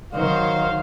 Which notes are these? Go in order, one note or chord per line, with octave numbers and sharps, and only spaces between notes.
D#3 F#3 C5 F5